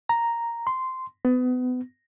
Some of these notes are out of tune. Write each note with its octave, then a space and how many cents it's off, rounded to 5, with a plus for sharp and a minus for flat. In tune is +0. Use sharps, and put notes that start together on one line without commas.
A#5 +0
C6 -10
B3 +30